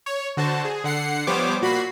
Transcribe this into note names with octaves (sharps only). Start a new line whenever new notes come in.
C#5
D3 F#4 C5 A5
G#4
D3 F#5 C7 C#7
F3 G3 B3 C5 C#5 D6
A#2 F#4 B5 C7